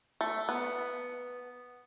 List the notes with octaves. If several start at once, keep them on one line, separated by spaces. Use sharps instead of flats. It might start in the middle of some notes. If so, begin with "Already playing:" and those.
A3
B3